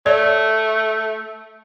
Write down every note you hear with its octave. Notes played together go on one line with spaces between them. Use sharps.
A3 C#5 D5